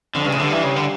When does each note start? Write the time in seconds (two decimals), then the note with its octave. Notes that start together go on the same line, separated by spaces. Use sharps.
0.15 F2 D3
0.24 G2 C#3
0.34 A2
0.39 G2 D3
0.52 E3
0.64 C#3
0.76 D3